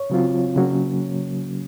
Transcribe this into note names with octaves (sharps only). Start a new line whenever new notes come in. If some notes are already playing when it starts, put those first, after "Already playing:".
Already playing: C#5
C#3 F#3 C4 F4
C#3 F#3 A#3 C#4